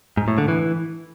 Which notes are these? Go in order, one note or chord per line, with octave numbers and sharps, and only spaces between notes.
G#2
A2
D3
E3